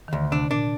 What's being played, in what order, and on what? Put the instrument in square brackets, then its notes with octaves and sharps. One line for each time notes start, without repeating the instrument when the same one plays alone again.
[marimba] D#3
[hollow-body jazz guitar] D2 [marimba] D3
[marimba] D3
[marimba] C3 [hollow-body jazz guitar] D4
[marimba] A#2 [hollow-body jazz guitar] D4